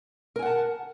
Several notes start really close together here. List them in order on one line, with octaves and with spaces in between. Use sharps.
A#4 G#5 F#5 A5